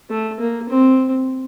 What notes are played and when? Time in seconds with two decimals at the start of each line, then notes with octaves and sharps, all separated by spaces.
0.10 A3
0.40 A#3
0.69 C4